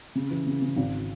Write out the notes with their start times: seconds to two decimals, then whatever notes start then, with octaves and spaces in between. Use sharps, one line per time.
0.15 C#3
0.31 E3
0.46 C#3
0.62 C#3
0.77 G#1